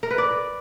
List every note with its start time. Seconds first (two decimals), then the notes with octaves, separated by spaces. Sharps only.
0.03 A#4
0.10 B4
0.18 D5